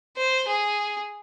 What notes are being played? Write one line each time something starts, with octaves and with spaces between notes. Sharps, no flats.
C5
G#4